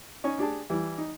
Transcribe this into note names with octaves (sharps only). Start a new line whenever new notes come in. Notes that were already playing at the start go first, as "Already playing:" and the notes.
C#4 D#4 C#5 G#5
D4 G4 G#4 A5
E3 G3
D#4